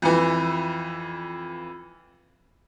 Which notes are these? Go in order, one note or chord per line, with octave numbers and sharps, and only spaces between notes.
F2 E3